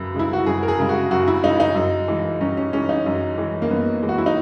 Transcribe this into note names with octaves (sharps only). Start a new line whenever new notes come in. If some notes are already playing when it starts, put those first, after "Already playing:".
Already playing: F#2 C#3 B4
C#3 G#3 E4
F#4
F#2 G#4
A#4
G#4
C#3 G#3
F#4
F#2 F#4
E4
C#3 G#3 D#4
D#4
F#2
E3 G#3
F#2 C#4
C#4
E3 G#3 C#4
D#4
F#2
E3 G#3
A#3
F#2 B3
E3 G#3
F#4
E4
D#4